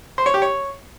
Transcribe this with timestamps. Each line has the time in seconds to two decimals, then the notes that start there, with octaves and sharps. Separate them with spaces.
0.18 C5
0.26 C#5
0.34 G4
0.42 C#5